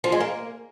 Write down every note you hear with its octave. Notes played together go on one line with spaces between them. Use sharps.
F3
G#3
A#3